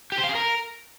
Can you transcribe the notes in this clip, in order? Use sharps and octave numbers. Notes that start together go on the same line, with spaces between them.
G4
C5
F5
G#4
A#4